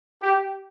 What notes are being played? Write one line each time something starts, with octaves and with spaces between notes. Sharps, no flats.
G4